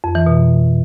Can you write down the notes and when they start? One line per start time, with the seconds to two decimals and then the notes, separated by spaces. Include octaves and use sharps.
0.04 F2
0.15 E3
0.26 B2